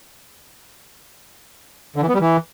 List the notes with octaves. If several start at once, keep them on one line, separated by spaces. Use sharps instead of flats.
D3
E3
B3
G3
E3